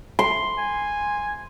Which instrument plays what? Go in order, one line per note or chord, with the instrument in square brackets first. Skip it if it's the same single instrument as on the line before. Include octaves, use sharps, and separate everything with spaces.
[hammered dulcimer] C6
[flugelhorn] G#5